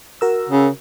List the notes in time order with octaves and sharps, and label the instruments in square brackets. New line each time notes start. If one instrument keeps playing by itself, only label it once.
[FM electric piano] F#4 A#4 E6
[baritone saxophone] C#3